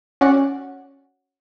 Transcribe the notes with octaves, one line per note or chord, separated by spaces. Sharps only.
C#4 F#4 D5 F#5